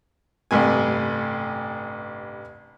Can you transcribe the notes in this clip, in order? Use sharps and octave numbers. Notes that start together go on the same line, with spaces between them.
A1 G2 C3 G#5